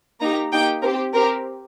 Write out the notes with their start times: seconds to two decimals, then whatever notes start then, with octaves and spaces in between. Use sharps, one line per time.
0.20 A#3 D#4 G4 A#5
0.52 A#3 D#4 G4 G5
0.82 C4 A#4
0.87 G4
1.14 C4 G4 A#4